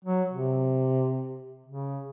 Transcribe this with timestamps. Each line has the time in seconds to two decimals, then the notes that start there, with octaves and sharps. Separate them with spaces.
0.05 F#3
0.32 C3
1.66 C#3